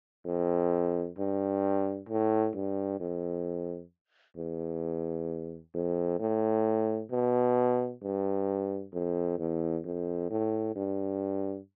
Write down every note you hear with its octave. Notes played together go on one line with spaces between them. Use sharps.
F2
G2
A2
G2
F2
E2
F2
A2
B2
G2
F2
E2
F2
A2
G2